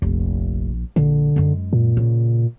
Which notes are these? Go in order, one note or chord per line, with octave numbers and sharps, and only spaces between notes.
F1 A#1
A#1 D3
F#2 G#3
A#2
C#3